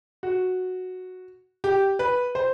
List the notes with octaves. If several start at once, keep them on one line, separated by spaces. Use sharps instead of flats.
F#4
G4
B4
C5